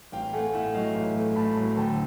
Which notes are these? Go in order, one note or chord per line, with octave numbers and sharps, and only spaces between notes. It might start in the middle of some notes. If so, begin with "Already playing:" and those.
A1 F5 G5
A3 F#5 G#5
A2 E5 F#5
F#3 D#5 F5
A1
A3
A2 A5 B5
F#3
D2 G5 A5